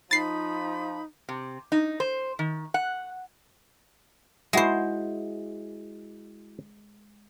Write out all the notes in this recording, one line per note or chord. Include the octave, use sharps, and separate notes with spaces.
F3 D#4 B5 A6 C7
C3
D#4
C5
D#3
F#5
G#3 E4 F#4 C5 E5